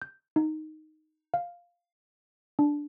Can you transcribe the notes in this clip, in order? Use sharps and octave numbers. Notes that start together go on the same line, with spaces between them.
G6
D#4
F5
D4